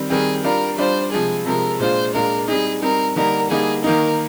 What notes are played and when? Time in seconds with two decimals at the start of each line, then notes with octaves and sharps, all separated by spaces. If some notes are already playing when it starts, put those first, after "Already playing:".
Already playing: D#3 G3 C4
0.10 D#3 G3 C4 G#4
0.44 G3 D4 F4 A#4
0.78 G3 D4 F4 C5
1.12 C3 F3 G#3 G#4
1.46 C3 F3 G#3 A#4
1.80 A#2 G#3 D4 F4 C5
2.14 A#2 G#3 D4 F4 A#4
2.48 G3 C4 D#4 G#4
2.82 G3 C4 D#4 A#4
3.16 D3 G3 A#3 D#4 A#4
3.50 D3 G3 A#3 D#4 G#4
3.84 D#3 A#3 D#4 A#4